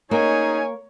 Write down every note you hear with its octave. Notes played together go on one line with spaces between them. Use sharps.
A#3 C#4 D#4 G#4 C#5 G#5